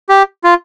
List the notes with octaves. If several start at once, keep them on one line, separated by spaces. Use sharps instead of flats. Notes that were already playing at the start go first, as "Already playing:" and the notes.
G4
F4